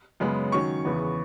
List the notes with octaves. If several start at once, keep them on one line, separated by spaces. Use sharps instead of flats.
F#2 C#3 G#3 B3
D#3 F#3 C#4 C#6
E2 C#3 E3 B3